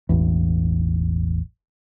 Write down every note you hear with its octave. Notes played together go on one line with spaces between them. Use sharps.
E1 A1 E2